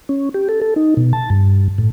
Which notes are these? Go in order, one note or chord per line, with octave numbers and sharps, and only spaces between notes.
C#4
G4
A4
A4
D#4
B2
A5
G2
A2